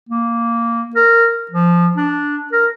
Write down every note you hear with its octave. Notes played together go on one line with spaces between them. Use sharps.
A#3
A#4
F3
D4
A#4